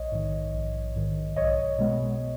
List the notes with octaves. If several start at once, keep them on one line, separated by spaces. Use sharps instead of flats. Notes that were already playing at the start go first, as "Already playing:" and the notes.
Already playing: A#1 C#5 D#5
G#2 D#3
A#1
G#2 D#3
B1 C#5 D#5
B2 G#3 B3